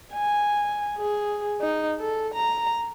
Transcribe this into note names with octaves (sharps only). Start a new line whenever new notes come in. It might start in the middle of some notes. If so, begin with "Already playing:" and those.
G#5
G#4
D#4
A4
A#5